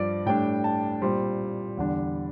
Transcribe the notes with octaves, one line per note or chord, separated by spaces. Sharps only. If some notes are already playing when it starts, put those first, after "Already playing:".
Already playing: G2 F3 D5
A2 G3 D4 G5
A5
A#2 G3 C4 C6
E2 D3 G3 D4